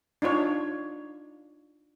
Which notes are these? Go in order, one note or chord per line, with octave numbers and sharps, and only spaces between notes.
D4 D#4 F4 C#5